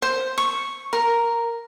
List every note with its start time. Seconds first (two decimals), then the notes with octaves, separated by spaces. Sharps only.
0.02 C5
0.38 C#6
0.93 A#4